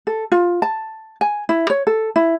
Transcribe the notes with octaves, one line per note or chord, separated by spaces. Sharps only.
A4
F4
A5
G#5
E4
C#5
A4
E4